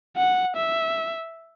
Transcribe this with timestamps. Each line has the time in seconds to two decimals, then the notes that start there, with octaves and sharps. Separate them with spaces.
0.17 F#5
0.56 E5